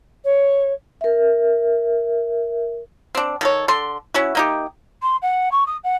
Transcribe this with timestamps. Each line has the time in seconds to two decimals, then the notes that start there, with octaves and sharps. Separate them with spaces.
0.24 C#5
1.01 A#4 E5
3.15 C4 D4
3.41 D#3 A4 C#5
3.68 D3 A4 C6
4.14 C#4 E4 F#4
4.35 A#3 D#4 G4
5.02 C6
5.22 F#5
5.52 C#6
5.67 D#6
5.84 F#5